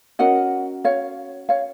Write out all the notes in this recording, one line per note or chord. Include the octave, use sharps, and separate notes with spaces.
C#4 F#4 A#4 D#5 F#5
C#5 F5
C#5 F5